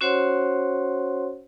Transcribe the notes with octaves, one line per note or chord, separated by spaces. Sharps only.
C#4 F#4 C5 C#5 F#5 C6